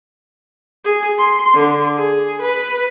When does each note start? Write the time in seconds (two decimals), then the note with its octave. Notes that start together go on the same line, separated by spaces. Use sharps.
0.85 G#4
1.18 C6
1.54 D3
1.97 G#4
2.42 B4